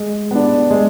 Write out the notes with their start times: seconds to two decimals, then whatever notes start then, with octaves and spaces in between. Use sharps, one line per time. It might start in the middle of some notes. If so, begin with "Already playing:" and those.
Already playing: G#3
0.31 B3 D4
0.71 G#3